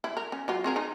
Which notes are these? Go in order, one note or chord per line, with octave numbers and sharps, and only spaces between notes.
E4
A#4
C#4
F#3 F4
C4 G#4 A#4
D#4